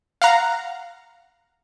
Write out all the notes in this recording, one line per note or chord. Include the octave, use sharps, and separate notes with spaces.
F5 F#5 A#5